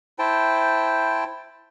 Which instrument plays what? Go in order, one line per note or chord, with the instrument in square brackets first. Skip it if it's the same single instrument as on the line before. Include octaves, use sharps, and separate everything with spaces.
[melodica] E4 C5 G5 A5